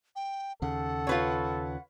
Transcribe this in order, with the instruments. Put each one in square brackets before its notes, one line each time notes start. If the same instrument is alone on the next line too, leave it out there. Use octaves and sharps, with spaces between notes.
[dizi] G5
[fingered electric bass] D#2 C#3 [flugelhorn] A4 [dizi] F#5
[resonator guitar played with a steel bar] F4 B4 C#5